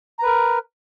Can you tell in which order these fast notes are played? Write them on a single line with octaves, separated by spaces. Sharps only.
A#5 B4 A#4